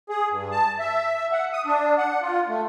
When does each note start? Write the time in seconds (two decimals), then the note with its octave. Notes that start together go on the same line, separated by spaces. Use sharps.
0.09 G#4
0.31 G2
0.51 A5
0.79 E5
1.32 F#5
1.53 D#6
1.66 D4
1.98 F#5
2.22 F4
2.48 A3